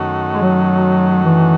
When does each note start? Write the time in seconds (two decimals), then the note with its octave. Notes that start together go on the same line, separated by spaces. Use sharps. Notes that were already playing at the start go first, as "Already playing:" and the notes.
Already playing: F#2 D#3 A3 C#4 F#4
0.33 G#3
0.42 F#3
1.24 E3